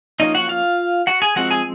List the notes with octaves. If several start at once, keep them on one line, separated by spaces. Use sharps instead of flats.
F3 A#3 C#4 D#4 D#5
F#4 F#5
F4 F5
F#4 F#5
G#4 G#5
F3 G#3 C4 F#4 F#5
G#4 G#5